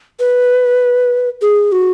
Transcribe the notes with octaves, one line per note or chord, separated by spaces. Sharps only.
B4
G#4
F#4